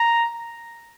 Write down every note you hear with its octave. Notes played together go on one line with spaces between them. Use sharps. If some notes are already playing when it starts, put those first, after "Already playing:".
Already playing: A#5